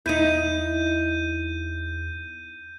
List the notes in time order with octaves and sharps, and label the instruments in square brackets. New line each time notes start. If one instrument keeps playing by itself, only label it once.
[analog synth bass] E2 [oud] D#4 E4 [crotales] G6 D#7